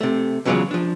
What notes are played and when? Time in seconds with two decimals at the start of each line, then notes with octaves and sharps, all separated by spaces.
0.01 C3 A3
0.45 E2 C#3 F#3 G#3 F4 D5
0.71 F3 D4